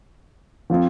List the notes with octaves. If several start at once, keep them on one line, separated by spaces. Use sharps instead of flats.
F3 C4 F4